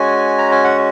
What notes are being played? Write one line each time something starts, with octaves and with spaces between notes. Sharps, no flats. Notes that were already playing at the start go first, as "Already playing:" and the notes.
Already playing: G#3 C#4 F#4 G#5
A#5
G#5
F#5